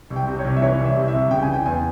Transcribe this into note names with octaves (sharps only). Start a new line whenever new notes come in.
C2
G5
C3
C#5
C2
E5
E3 C#5
C2
E5
C3
E5
C2
C#3 G5
G#5
E3
G5
E2 G#5